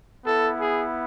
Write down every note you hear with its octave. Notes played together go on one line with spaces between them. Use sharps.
B3 E4 A4
G#4